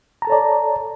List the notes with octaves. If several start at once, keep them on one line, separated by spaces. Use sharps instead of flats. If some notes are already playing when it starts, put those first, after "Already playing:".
A4 C#5 D5 A5 A#5